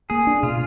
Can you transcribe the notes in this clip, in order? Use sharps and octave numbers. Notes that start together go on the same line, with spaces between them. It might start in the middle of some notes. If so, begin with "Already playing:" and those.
A#3 G#4
D4
B2 F4